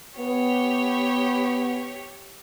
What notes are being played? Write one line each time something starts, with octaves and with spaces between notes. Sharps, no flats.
B3 G4 C#5